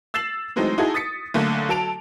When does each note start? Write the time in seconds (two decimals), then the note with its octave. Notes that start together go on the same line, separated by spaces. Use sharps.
0.14 E6 A6 C7 E7 F#7
0.56 E3 F#3 G#3 A3 C4 D#4
0.78 D#4 E4 F#4 G#4 A4
0.94 D#6 A6 B6 C#7
1.34 B1 D3 A3 A#3
1.69 F#3 A4 A5 D7 F7